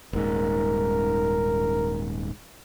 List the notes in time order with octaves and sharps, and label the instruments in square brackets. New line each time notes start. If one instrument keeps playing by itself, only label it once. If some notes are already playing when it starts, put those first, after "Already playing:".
[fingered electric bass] D#1 G#2 [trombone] A#4